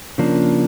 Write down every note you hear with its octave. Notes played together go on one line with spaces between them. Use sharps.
C#3 F3 A#3 D4